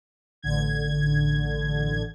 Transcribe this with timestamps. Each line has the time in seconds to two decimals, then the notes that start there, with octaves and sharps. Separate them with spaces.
0.43 A1 D3 G#6